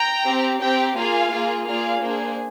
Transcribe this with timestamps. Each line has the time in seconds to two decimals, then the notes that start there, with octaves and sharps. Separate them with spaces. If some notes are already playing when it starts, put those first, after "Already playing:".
Already playing: G5 A#5
0.27 C4 G4
0.62 C4 G4 G5 A#5
0.97 A#3 F4 G#4 F5 G#5
1.32 A#3 F4 G#4
1.67 A#3 F4 G#4 D5 F5
2.02 A#3 D4 G#4 C5